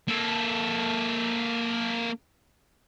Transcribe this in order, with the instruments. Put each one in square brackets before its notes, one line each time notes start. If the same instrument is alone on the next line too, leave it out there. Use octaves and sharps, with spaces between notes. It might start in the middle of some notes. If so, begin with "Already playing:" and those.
[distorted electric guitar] A#3 A4